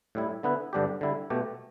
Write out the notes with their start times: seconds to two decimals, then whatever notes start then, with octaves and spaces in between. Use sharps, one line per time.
0.15 A2 G3 E4
0.43 D3 B3 E4 B4
0.73 G2 D3 G3 D4 G4
1.01 D3 G3 E4
1.30 B2 A3 G4